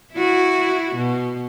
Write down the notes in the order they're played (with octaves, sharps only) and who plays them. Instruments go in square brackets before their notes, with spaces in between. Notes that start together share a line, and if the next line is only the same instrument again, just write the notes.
[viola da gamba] E4 F#4
B2